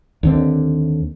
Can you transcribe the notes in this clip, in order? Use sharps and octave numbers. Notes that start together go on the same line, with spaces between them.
D#2 D3 C4